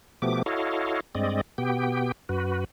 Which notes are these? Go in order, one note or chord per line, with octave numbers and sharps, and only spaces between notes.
B2 F3 A3 B3 G4 D6
E4 F#4 A4 C#5 D#5 F5
G2 G#3 C4 D5 D#5
B2 B3 G4 G5
F#2 F#4 B4